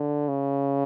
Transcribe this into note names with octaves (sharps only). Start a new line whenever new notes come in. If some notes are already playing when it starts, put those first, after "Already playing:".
Already playing: D3
C#3